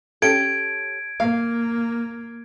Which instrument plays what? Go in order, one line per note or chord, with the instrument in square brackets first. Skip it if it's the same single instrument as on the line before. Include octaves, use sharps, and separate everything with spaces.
[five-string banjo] C#4 G4 A4 [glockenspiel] G#6 D7
[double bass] A#3 [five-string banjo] F5